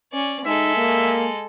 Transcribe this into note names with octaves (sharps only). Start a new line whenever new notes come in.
C#4 D5
G#3 D#4 A4 E5
A#3